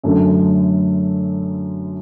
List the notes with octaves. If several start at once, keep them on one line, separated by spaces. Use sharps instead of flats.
F#2 D3 F#3 A3